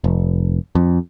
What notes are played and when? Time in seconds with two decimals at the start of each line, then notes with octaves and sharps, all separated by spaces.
0.04 F1
0.75 F2